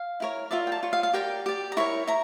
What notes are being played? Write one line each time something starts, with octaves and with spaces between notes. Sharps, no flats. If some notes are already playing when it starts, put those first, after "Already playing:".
Already playing: F5
E4 A#4 C#5
F4 A#4 D5 E5
G5
A5
F4 C#5
F5
F5
G4 A#4 D5 G5
G4 D5
A#5
E4 A#4 C#5 C#6
E4 A#5